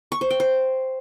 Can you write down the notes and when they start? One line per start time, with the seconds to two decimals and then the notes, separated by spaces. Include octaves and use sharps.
0.12 C#6
0.21 C5
0.30 G5
0.40 C5